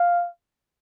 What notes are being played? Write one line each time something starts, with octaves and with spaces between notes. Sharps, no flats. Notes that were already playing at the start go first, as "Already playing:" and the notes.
Already playing: F5